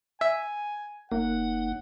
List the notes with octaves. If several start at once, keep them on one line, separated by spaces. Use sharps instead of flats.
E5 G#5
F#1 A#3 D#4 F#5